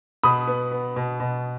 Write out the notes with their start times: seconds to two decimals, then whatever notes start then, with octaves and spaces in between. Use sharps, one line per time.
0.23 B2 B5 D#6
0.47 B3
0.72 B3
0.96 B2
1.20 B2